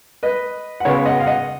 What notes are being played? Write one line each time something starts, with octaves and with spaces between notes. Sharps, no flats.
B4 D#5
F#5
C#2 C#3 G#3 B3 C#5 F5
D#5 F#5
F5
D#5 F#5